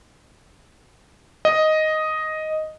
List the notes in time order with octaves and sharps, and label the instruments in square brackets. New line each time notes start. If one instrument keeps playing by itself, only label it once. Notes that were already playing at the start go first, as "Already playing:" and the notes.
[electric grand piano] D#5